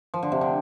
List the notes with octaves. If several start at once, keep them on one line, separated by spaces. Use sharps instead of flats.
F3
D3
C3
D3